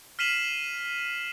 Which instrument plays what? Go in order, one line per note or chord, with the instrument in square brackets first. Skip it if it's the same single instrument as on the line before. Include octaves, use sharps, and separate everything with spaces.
[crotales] F6 B6 C7 D#7 E7 F#7